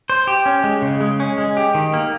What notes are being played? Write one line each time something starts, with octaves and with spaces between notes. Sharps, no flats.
C5
G4
C#4
G#3
C#3
G#3
C#4
G#3
G4
D#3
A#3